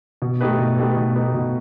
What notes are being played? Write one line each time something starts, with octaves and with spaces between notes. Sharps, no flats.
B2
A3 D#4 G4 B4
B2
A3 D#4 G4 B4
B2
A3 D#4 G4 B4
B2